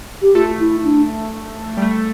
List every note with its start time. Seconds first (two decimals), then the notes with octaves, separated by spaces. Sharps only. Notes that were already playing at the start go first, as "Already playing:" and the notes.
0.22 G4
0.35 A3 F4
0.60 E4
0.84 D4
1.77 G3
1.82 A3